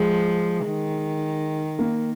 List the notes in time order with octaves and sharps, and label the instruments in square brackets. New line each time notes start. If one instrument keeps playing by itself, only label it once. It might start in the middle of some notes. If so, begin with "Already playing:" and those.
Already playing: [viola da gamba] F3 [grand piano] G#3
[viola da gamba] D#3
[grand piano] A#3